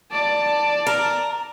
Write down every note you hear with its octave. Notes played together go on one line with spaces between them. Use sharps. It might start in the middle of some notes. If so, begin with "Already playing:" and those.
D5 A5
A#4